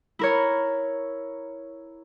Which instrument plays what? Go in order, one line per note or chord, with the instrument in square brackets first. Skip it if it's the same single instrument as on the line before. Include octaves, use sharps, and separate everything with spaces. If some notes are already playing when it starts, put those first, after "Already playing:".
[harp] E4 A#4 C#5